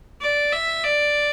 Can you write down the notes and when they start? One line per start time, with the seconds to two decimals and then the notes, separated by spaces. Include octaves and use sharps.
0.21 D5
0.52 E5
0.84 D5